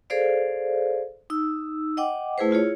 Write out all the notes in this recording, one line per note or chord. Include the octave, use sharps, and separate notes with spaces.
G#4 A4 C5 D5 F5
D#4 E6
D#5 F#5 G5 D6
A3 E4 G#4 B4 C5
E4 F4 G#4 C#5